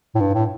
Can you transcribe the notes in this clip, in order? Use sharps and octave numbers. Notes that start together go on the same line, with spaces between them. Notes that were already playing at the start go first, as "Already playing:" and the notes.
A2
G2
A2